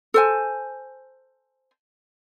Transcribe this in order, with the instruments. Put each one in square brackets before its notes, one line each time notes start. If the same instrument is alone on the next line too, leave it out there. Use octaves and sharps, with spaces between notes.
[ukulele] A4 C5 G#5